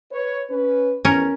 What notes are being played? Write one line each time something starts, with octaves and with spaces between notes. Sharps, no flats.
B4 C#5
C#4 B4
E2 C#4 A#4